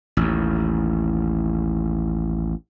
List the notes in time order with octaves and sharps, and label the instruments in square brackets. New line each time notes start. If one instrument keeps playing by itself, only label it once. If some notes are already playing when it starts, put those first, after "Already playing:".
[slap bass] A1 D#2